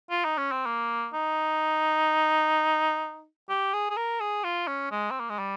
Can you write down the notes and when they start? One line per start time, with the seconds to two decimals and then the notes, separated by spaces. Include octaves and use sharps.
0.11 F4
0.24 D#4
0.38 C#4
0.52 C4
0.66 A#3
1.13 D#4
3.50 G4
3.73 G#4
3.90 G#4
3.97 A#4
4.20 G#4
4.44 F4
4.67 C#4
4.91 G#3
5.11 C4
5.20 A#3
5.30 G#3
5.39 G3